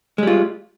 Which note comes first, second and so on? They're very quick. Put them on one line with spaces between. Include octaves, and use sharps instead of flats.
G#3 G3 F4